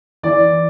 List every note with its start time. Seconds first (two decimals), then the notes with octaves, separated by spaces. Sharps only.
0.23 E3 D5